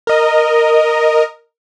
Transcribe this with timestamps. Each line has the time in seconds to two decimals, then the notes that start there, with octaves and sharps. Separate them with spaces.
0.07 A#4 D#5